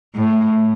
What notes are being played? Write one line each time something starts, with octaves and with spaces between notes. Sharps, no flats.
A2